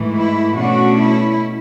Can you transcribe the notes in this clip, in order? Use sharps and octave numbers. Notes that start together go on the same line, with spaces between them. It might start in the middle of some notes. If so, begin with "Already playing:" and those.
Already playing: G#2 E3 A3
E4
B2 A3 C#4 D4 F#4
E4